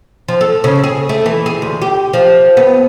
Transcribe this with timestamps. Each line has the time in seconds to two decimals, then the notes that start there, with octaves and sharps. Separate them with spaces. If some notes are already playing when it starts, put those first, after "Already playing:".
0.28 F3
0.41 A4
0.64 C#3
0.84 G#4
1.09 A3
1.26 E3
1.46 G#4
1.62 D2
1.82 G4
2.13 F3
2.57 B3